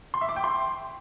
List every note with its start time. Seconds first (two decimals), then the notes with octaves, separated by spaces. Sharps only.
0.14 C6
0.21 E5
0.29 D6
0.36 G5
0.44 C6